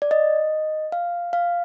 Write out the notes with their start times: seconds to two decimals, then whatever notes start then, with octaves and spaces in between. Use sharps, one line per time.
0.02 D5
0.11 D#5
0.92 F5
1.33 F5